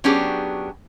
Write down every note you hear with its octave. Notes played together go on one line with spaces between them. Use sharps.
F#3 B3 C#4 D4 G4 G#4